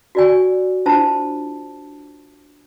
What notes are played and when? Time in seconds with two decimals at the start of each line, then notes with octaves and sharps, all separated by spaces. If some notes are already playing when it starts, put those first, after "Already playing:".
0.15 F#4 D5 G#5
0.86 D4 E4 F4 C5 A5